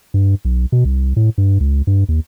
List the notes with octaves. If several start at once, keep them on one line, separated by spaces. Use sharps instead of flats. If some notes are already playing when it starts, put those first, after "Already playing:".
G2
B1
B2
C2
A2
G2
C#2
G2
D#2